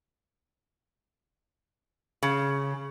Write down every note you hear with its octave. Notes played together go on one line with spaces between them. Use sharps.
C#3